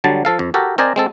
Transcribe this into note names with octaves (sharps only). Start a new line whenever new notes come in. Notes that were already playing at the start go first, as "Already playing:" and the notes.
D3 F#3 G3 A5
F3 A4 F5
F2
F#4 G4 A4 A#4
C4 A#4 C5 D5 D#5 G#5
G#3 C4 A4